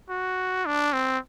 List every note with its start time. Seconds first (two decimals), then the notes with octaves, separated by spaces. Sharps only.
0.10 F#4
0.66 D4
0.93 C4